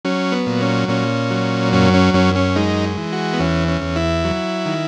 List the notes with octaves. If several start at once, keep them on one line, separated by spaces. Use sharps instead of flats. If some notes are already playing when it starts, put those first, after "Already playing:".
F#3 C#4
B3
A#2
C#4
A#2 C#4
F#3
F#2 C#4
C#4
F#2 C#4
C#4
G#3 D#4
E3
F#4
B3
E2 C#4
C#4
E2
E4
F#3
D#3